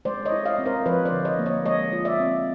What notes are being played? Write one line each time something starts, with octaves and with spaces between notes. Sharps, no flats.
G#3 C5 D5
C#5 D#5
E4
D#5 F5
C4
A#4 C5
F3 B4 C#5
C5 D5
D3
C#5 D#5
A#3
C#5 D#5
G#3 C#5 D#5
F4
D5 E5
C4